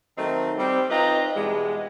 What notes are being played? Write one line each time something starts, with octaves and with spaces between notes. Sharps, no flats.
D#3 F#3 A3 C4 D#4
G3 C4
C4 D#4 F4 B4 D#5 A#5
B2 E3 G3 G#3